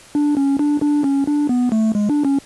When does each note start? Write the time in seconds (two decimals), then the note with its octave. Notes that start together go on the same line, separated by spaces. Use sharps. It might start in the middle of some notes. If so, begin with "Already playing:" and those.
0.15 D4
0.37 C#4
0.59 D4
0.82 D4
1.04 C#4
1.27 D4
1.49 B3
1.72 A3
1.95 G#3
2.10 D4
2.25 C#4